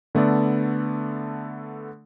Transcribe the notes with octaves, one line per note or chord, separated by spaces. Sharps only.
D3 A3 B3 A4 D5